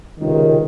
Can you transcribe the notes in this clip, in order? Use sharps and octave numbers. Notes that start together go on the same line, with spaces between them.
C#2 C3 D#3